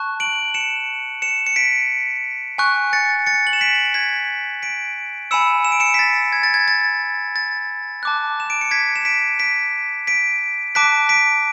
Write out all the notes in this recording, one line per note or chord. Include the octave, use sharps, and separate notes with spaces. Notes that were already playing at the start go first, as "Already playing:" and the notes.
Already playing: A5 C#6 F#6
D7 F#7
C#7 E7
C#7 E7
C#7
B6 D7
G#5 C#6 F#6
A6 C#7
A6 C#7
F#7
E7
B6 D7
G#6 B6
B6 D7
G#5 B5 E6 C#7 E7
E7
D7
C#7 E7
B6
A6
G#6
A6
G#6
A6
A6
A5 D6 F#6
E7
D7
C#7
G#6 B6
E7
B6 D7
B6 D7
B6 D7
A5 D6 F#6 B6 D7
B6 D7